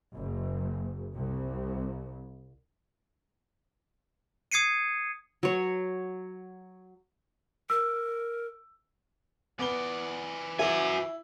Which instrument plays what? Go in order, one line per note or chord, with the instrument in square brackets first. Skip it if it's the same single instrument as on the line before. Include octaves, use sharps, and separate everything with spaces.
[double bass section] F#1
C2
[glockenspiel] D#6 G#6 C7 C#7 D#7
[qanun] F#3 C#5
[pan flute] A#4 [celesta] E6
[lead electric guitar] E3 D5 [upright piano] B3 B4 G7
[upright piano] E4 [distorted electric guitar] F#4 G#5